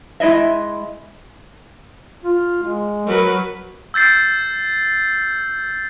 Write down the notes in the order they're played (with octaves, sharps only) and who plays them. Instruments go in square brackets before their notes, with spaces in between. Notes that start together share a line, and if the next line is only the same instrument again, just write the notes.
[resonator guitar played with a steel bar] G#3 E4 D#5 E5
[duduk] F4
G#3
[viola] F#3 B4 [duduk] A#4
[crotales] E6 G6 A6 C7